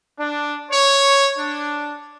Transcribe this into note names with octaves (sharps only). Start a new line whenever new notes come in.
D4
C#5
D4